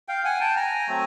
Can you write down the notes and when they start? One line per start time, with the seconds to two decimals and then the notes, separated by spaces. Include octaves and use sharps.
0.08 F5 G5
0.25 F#5 G#5
0.40 G5 A5
0.56 G#5 A#5
0.88 F#3 A3 C4